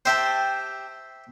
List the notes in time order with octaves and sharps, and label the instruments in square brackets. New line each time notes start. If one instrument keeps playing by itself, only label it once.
[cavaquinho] G4 G5 A5 [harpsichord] C5 E5